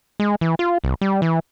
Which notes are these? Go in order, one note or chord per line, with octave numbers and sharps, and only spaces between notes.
G#3
E3
F4
C2
G3
E3